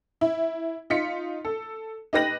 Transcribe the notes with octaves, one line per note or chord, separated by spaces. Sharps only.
E4
D#4 F4 B6 C#7
A4
D#4 G4 B4 A#6 D#7 F#7